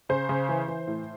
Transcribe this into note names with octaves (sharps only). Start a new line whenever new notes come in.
C#3 C5
C#3
E3
E3
A2